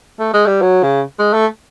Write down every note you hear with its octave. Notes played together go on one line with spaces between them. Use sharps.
A3
G#3
G3
F#3
C#3
G#3
A3